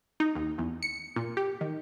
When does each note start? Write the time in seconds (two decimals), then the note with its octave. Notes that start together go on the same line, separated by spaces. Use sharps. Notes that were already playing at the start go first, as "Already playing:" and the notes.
0.20 D#4
0.35 D#2
0.58 E2
0.83 C#7
1.16 A#2
1.37 G4
1.61 D#3